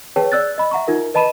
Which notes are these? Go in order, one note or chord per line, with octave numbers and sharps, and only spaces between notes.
G#4 B4 C#5 G5 A5
D5 E6 F#6 A6
D#5 B5
E5 F#5 A#5 C#6
D#4 F4 A#4
B4 D#5 A5 B5 D#7 E7